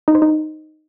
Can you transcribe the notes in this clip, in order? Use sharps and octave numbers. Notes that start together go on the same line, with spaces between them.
D#4
C5
D#4